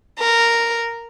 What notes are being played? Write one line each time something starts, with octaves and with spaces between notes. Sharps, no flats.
A#4